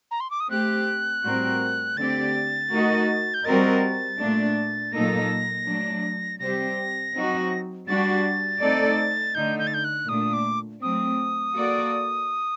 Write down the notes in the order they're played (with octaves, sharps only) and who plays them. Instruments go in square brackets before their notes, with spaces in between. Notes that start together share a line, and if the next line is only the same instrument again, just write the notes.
[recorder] A#5
C6
D6
D#6
[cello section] A3 C4 G4 [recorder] F#6
[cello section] A2 G3 C4 F#4 A#4
[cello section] D3 A3 C4 G4 D5 [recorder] A6
[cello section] A3 D#4 F#4 A#4 D#5
[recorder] G6
[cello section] G3 C4 F#4 A#4 D#5 [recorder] A6
[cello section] A#2 A3 D4
[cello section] A#2 F#3 A#3 D#4 A4 [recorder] A#6
[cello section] F#3 A3 D4
[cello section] C3 G3 C4 G4 C5 [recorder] A#6
[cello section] F#3 C4 D#4 F#4
[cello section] G3 D4 F#4 [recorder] A6
[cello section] A3 C4 D#4 A4 D5
[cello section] D3 A3 D#4 [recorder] G6
[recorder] G6
A6
G6
F#6
[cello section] A#2 A3 D4 [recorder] D#6
[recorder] D6
[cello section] F#3 A3 C4 [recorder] D#6
[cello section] A#3 F#4 A4 D5